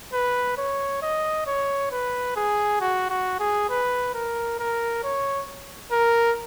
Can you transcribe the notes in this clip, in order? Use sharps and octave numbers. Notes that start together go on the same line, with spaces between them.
B4
C#5
D#5
C#5
B4
G#4
F#4
F#4
G#4
B4
A#4
A#4
C#5
A#4